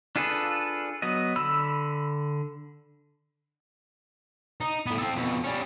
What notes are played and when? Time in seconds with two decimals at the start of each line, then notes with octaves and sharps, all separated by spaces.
0.16 D4 F4 G#4 A4 B4
1.02 F#3 B3 D#5
1.36 D3 B5 E6
4.60 D#4
4.86 A2 B3
4.98 C4 A4
5.16 F2 B2
5.44 G3 C#4